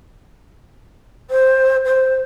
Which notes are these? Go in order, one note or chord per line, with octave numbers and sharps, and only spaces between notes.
C5
C5